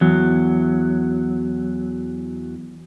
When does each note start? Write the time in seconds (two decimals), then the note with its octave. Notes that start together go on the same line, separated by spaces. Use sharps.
0.01 E2 F#3